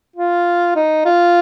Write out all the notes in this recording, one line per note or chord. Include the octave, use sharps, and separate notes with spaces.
F4
D#4
F4